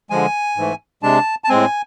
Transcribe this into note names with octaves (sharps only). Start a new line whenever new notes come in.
D3 F3 G#3 G#5
G#2 E3 A3
C3 G#3 D4 A5
A5
A2 G#3 C4 G#5